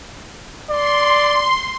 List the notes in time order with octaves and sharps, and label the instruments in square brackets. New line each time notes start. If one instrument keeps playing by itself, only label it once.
[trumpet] D5 [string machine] C6